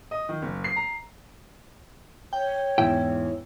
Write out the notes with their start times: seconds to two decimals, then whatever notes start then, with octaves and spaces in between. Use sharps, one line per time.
0.11 D#5
0.29 D#3
0.42 F#1
0.64 C7
0.76 A#5
2.33 C#5 G5
2.78 E2 G#2 E4 G5